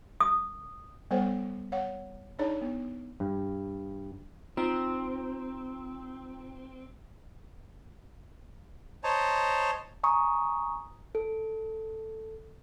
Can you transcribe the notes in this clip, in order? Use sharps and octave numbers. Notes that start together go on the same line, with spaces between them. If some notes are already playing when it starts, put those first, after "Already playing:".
D#6
G3 B3 A4 C5 C#5 F#5
C#5 F5 F#5
D4 D#4 G#4 C#5 D5 A5
B3
G2
C4 D#4 F4 A#5
C5 C#5 D#5 A5 A#5
G#5 A#5 C#6 D#6
A4